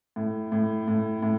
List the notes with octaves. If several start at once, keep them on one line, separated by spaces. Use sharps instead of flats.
A2
A2
A2
A2